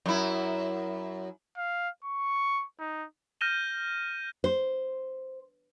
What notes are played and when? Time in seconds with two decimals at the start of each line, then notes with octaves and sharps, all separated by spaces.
0.06 F#2 E4
1.57 F5
2.04 C#6
2.79 D#4
3.41 F6 G6 A#6 D#7 E7 G7
4.44 C5